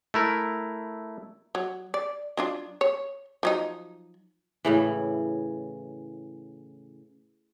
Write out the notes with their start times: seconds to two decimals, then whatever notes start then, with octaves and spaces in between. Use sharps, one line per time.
0.14 A3 E4 A#4
1.55 F#3
1.94 D5
2.37 F#3 D4 F4
2.81 C#5
3.43 F3 F#3 D#4
4.65 A2 C#3 E3